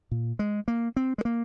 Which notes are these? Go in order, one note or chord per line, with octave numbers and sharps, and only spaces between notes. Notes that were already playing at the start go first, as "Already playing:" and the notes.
A#2
G#3
A#3
C4
G#3
A#3